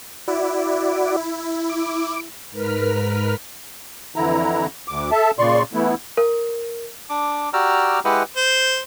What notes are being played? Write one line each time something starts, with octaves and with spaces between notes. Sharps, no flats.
E4 F#4 D5
D6
G#2 A#4 B4 F6 B6
F2 D3 E3 E4 A#5
D2 D6
A4 E5 A5
A#2 C#3 D5 C6 C#6
E3 A3 B3 E4
A#4
D4 D6
F#4 G4 D5 A#5 E6 F6
G#3 E4 G4 B4 D#5 F#5
C5